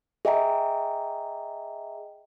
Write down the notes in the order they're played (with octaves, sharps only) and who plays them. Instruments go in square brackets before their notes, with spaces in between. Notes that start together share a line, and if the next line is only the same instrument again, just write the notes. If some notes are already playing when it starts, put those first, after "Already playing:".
[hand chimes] G#4 D#5 E5 G5 A#5